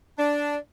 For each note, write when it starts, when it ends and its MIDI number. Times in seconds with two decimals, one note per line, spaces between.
0.18 0.55 62